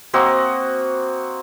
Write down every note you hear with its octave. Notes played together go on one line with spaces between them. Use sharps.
A#3 C4 F#4 D#5